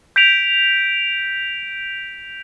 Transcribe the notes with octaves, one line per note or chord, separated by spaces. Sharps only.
G6 B6 D7 F7